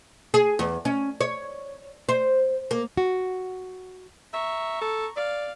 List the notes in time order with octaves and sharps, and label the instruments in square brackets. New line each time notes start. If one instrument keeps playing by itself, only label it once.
[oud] G#4
E2
C#4
C#5
C5
A#3
[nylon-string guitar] F#4
[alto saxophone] E5 [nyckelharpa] A#5 C#6
[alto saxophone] A4
[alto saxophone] D5 [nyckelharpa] F5